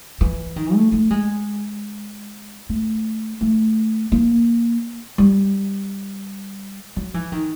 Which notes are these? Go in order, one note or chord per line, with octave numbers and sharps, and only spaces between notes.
E3
D#3
A3
A3
G#3
A3
A3
A#3
G3
F#3
E3
D#3